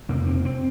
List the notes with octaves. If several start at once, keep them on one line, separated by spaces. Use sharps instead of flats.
F2 C3 A#3
C4
C4